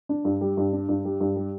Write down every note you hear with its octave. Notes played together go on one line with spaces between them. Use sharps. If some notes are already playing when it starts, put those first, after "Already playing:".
D4
G2
G3
G2
D4
G2
G3
G2
G3